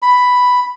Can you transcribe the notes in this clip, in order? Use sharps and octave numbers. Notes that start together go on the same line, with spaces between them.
B5